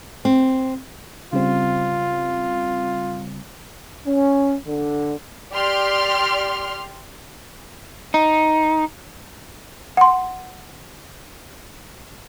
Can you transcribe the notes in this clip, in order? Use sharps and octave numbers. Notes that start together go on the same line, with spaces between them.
C4
C#3 G3 C4 F4
C#4
D3
G4 D5 C6 F6
D#4
F#5 C6